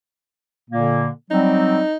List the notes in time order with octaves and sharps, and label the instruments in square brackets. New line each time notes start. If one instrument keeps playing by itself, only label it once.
[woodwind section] A#2 D3 A#3
[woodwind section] F#3 G3 C4 [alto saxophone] D#4